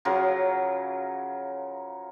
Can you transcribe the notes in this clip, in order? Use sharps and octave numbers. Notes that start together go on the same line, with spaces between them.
C#3 F3 F#3 A#4